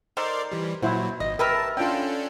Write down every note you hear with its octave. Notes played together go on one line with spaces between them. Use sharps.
D#3 A4 A#4 C5 D5 C6
E3 G3
A#2 F#3 E4 C5 F#5
G#1 D#5
G4 A#4 B4 E5 A5
C#4 D4 F4 A4 G5